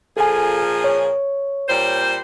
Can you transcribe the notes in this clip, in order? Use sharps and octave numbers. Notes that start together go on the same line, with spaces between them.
A#2 F3 G#4 A4 G#5
C#5
A#2 G3 C5